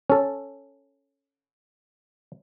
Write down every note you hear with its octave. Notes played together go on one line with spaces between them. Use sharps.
C#4 A4